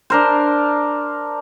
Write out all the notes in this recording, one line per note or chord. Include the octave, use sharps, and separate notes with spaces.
D4 A#4 C5